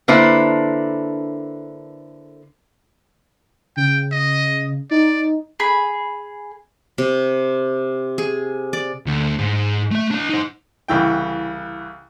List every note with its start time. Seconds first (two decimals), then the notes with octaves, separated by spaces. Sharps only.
0.08 D3 A#3 D4 E4 B4 C5
3.77 C#3 G5
4.12 D#5
4.91 D#4 D5
5.60 G#4 B5
6.98 C3
8.18 G#4
8.73 D5
9.07 D2
9.39 G#2
9.92 A3 E5
10.11 D4 D#5
10.30 D#4 C5
10.88 C2 C#3 E3 G5